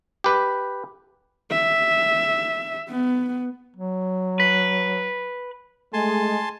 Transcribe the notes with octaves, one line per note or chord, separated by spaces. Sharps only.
G4 B4
E5
B3
F#3
B4
G#3 A3 G#5 A5 C6